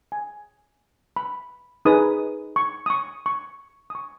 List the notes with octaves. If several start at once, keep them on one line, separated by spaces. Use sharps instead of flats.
G#5
B5
D#4 G#4 B4 D#6
C#6
D#6
C#6
C#6
D#6
C#6